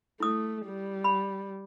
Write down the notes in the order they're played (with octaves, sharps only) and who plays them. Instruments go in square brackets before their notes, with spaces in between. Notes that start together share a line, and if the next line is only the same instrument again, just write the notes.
[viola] A3 [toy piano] E4 D#6
[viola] G3
[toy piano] B5